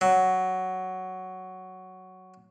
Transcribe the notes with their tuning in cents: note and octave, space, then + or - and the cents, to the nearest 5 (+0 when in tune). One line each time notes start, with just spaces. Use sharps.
F#3 +5